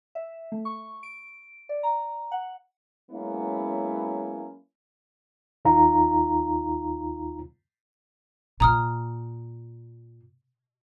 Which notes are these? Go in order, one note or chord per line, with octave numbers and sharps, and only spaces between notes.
E5
A3
C#6
D7
D5
A#5
F#5
F#3 G#3 A#3 B3 C#4 E4
D#2 D#4 F4 A#5
A#2 A#5 D#6 F6